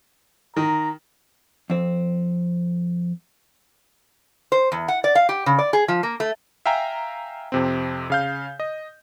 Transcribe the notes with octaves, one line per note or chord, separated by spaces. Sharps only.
D#3 A#5
F2 C4
C5
E2
F#5
D5
F5
G4
C#3
D5
G#4
F3
A#3
A3
E5 F5 G5 G#5 A#5
F2 C3 C4
C#3 F5 G6
D#5